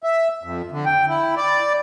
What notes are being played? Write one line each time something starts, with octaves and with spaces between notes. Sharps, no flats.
E5
F2
D3
G5
E4
D5